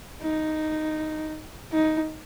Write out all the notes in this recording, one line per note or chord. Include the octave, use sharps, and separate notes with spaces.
D#4
D#4